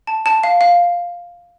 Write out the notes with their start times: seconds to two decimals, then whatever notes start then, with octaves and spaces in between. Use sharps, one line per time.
0.07 A5
0.26 A5
0.44 F5
0.61 F5